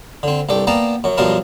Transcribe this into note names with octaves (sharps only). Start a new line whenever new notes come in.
D3 C4
C2 G2 A4 D5 G5
A#3 B3 D5 G5 A5 A#5
F#2 F#3
F#2 B2 F3 G3 A#4 A5